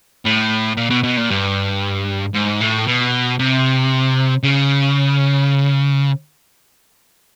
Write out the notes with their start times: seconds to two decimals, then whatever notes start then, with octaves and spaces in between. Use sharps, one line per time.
0.25 A2
0.77 A#2
0.90 B2
1.03 B2
1.17 A#2
1.30 G2
2.34 G#2
2.60 A2
2.87 B2
3.39 C3
4.43 C#3